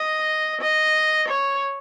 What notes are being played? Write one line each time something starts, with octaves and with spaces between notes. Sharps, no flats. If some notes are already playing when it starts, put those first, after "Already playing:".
Already playing: D#5
D#5
C#5